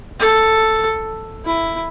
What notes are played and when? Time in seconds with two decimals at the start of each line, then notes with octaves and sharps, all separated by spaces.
0.20 A4
1.45 E4